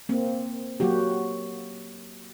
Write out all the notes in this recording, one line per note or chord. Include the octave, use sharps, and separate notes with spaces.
A#3 C4
F#3 A#3 F#4 G4